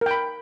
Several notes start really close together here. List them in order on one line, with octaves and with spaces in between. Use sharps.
A#4 G5 B5